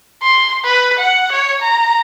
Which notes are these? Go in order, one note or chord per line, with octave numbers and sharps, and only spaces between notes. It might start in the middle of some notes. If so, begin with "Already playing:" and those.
C6
B4
F#5
C#5
A#5